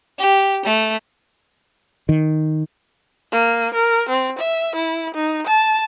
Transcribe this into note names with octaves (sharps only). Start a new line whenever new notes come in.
G4
A3
D#3
A#3
A#4
C4
E5
E4
D#4
A5